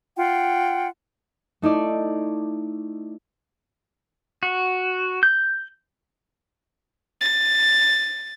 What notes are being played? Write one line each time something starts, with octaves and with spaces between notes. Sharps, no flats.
F4 F#5 G5
A3 D#4 E4 D5
F#4
G6
A6